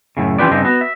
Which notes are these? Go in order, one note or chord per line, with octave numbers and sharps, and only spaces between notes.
F#2 A2 C#3
E3 C#4 F4 G4 B4 D5
G2 C#3 C4 D4 D#4
B3 F#4
E5